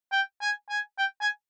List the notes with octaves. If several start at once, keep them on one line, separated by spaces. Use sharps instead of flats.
G5
G#5
G#5
G5
G#5